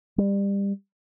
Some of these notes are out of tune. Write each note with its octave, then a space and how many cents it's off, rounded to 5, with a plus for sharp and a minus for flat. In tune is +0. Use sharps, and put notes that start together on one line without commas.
G3 +25